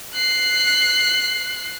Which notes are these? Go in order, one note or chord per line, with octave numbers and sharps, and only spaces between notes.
F#6 C7